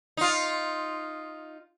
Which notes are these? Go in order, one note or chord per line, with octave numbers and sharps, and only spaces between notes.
D#4 F4